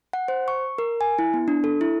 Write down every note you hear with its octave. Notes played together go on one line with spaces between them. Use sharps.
F#5
C5
C#6
A#4
G#5
E4
B3
D4
A4
E4